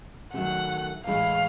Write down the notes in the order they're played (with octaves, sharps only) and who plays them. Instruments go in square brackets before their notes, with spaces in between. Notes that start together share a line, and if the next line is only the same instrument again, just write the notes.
[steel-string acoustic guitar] D#3 F#3 A3 C#4 [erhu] F#5
[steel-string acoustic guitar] A2 E3 G#3 C#4 E4 [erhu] F5